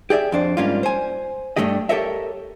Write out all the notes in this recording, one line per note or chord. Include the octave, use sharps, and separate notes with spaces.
G4 G#4 D5 E5
F2 D4 C5
G#2 G3 A#3 C#4 D4 F4
C5 G#5
G2 C#3 A3 D4 G4 D#5
G4 A4 A#4 C#5 D#5 E5